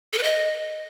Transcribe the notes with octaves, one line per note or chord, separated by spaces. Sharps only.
A4
B4
D#5